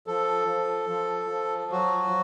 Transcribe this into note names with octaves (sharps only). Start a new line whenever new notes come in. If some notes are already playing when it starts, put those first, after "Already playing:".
F3 A4
F3
F3
F3
F#3 F#4